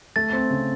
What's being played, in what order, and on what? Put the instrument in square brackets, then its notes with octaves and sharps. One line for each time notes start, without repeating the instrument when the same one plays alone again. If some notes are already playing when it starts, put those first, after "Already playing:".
[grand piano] A3 [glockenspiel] A6
[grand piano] C4
C#3